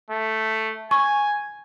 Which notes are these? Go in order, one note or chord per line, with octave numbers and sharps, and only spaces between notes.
A3
G#5 C#6